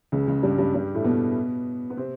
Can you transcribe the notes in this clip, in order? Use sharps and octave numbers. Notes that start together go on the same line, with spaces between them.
C#2 C#3
C#2 C#3
G2 G3
G2 G3
G2 G3
A2 A3
B2 B3
B3
C3 C4